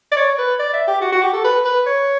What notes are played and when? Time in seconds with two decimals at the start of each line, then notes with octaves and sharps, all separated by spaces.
0.12 D5
0.17 C#5
0.38 B4
0.59 D5
0.74 E5
0.88 G4
1.01 F#4
1.12 F#4
1.23 G4
1.33 A4
1.44 B4
1.65 B4
1.87 C#5